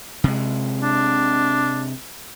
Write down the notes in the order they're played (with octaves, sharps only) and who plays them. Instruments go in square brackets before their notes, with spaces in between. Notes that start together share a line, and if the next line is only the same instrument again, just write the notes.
[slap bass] C3 G#3
[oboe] D4